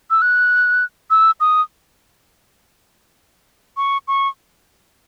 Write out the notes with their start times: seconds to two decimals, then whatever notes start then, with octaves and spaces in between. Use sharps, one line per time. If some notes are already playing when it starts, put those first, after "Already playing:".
0.10 E6
0.22 F#6
1.10 E6
1.40 D#6
3.77 C#6
4.08 C#6